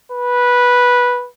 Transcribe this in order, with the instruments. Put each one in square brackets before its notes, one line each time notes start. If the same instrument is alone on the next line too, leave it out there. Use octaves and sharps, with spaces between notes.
[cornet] B4